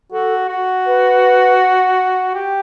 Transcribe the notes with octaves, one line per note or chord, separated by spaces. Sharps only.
F#4 A4
F#4
B4
G4